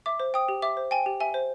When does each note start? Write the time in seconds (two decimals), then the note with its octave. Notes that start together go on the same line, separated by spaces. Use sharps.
0.06 E5 D6
0.20 C5
0.34 G5 D#6
0.48 G4
0.62 E5 D6
0.77 C5
0.91 G5 G#5
1.06 G4
1.20 E5 G#5
1.34 C5